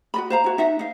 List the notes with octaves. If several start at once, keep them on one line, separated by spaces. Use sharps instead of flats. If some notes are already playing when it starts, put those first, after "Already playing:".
F#4 D#5 B5
C5 F5 A#5
E4 F#4
D#4 E5 F#5
D#4 F5